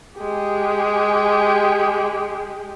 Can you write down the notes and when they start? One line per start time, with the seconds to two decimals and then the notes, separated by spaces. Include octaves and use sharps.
0.19 G#3 G4